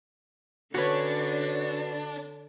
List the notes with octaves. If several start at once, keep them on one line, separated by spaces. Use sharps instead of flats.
D3 C#4 D4 F#4 B4 C#5